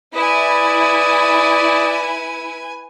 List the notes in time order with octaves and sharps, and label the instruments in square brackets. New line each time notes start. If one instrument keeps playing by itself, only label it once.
[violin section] E4 [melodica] G#4 [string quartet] B4 G#5 [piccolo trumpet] D5